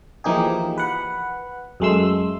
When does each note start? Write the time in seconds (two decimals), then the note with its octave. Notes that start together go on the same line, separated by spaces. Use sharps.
0.24 E3 F3 A#3 D#4 G4 G#4
0.78 B4 F#5
1.80 F#2 F#3 G#3 A3 C6 E6